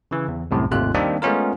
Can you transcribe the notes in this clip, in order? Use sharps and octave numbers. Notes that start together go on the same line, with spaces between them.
C#3 E3
E2
C2 F#2 A2 C3
G#1 D#2 C3 A3 F4 F#6
D#3 G3 A#3 C4 D4 D#4
G#3 A3 B3 C#4 F4 A#4